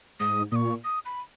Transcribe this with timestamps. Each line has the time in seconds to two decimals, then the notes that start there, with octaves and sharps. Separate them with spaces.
0.20 G#2 D#6
0.52 A#2 D#6
0.56 C#6
0.84 D#6
1.05 B5